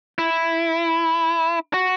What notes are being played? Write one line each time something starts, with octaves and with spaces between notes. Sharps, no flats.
E4
F#4